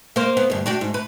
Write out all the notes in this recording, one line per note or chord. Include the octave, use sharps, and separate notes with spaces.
A#3 C5
B3
D2 G2
D4 F#4 G4
G#2
B4